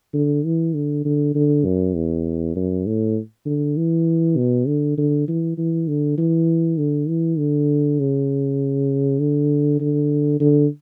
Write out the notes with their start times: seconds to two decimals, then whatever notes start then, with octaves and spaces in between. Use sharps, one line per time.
0.14 D3
0.45 E3
0.75 D3
1.05 D3
1.35 D3
1.65 F#2
1.95 E2
2.55 F#2
2.86 A2
3.46 D3
3.77 E3
4.37 B2
4.67 D3
4.97 D3
5.28 E3
5.58 E3
5.88 D3
6.18 E3
6.78 D3
7.08 E3
7.38 D3
7.99 C#3
9.19 D3
9.80 D3
10.40 D3